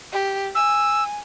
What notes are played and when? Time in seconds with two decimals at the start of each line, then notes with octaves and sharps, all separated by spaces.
0.12 G4
0.55 G#5 E6